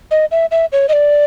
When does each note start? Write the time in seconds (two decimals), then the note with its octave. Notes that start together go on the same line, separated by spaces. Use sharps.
0.11 D#5
0.31 E5
0.51 E5
0.72 C#5
0.89 D#5
0.93 D5